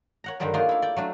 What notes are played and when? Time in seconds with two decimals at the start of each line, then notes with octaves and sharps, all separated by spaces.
0.24 C#5 F#5 A#5
0.40 G2 D3 D#3 F#3 G3 A#4
0.54 A3 A#3 D4 D#4 F4 G#4
0.69 E4 F5
0.82 D5 G5
0.96 F#3 A3 D4